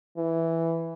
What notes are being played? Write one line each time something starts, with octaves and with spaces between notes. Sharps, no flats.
E3